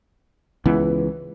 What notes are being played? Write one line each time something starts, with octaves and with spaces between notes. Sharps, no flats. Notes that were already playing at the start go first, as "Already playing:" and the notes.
C#2 E3 B3